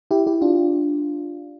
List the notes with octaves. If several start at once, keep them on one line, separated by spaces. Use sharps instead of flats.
E4 G4
E4 G4
D4 F4